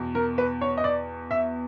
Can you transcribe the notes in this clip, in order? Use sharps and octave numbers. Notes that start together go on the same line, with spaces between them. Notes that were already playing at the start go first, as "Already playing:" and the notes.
Already playing: E2 B2
A#4
B4
C#5
D#5
D5
E5